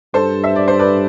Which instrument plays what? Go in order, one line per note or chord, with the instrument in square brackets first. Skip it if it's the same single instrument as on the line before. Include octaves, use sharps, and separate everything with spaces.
[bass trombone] G2 [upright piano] A4 C5
[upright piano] E5
D5
C5
B4 D5